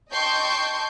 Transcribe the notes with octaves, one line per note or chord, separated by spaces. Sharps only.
D#5 G5 A5 C6 C#6 G6